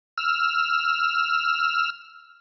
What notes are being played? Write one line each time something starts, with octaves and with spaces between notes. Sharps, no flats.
E6 F6